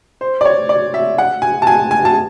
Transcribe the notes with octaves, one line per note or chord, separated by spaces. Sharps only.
C5
D5
C#5
D5
E5
F#5
G#5
A5
G#5
G#5
A5